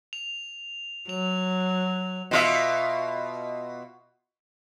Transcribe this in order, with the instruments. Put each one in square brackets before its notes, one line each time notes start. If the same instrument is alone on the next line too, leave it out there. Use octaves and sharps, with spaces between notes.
[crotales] F7
[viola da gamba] F#3 [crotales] F7
[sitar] B2 F4 E5